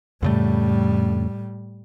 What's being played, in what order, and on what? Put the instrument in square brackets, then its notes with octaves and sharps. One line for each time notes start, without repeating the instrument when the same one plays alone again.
[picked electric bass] F2 C#3 A3 [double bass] A2 G3